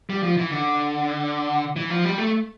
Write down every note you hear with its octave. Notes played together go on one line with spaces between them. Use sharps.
G3
F3
E3
D3
E3
F3
G3
A3